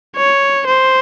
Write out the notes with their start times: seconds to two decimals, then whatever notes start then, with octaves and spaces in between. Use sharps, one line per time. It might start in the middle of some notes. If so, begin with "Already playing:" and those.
0.16 C#5
0.67 C5